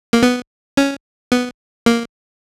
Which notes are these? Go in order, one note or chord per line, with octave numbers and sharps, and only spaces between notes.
A#3
B3
C#4
B3
A#3